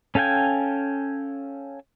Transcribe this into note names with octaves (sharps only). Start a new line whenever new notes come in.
C#4 A4 F5 G5 G#5